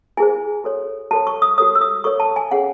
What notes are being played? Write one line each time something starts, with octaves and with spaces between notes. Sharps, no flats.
E4 G#4 C5 G#5
F#4 A4 C#5
F#4 A4 C#5 A5
C#6
D#6
F#4 A4 C#5 D#6
E6
D#6
F#4 A4 C#5 C#6
A5
G#5
C#4 G#4 C#5 F#5